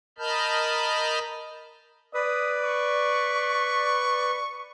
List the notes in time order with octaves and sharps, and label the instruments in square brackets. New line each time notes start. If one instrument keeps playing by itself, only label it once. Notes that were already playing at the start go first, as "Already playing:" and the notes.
[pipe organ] A#4 D#5 A5 B5 F6 G6
[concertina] B4 [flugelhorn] D5 [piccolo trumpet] D#6
[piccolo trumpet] C#6